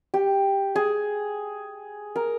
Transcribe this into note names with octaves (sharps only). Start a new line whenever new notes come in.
G4
G#4
A#4